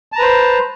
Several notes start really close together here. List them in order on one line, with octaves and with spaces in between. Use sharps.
A5 A#5 B4 C5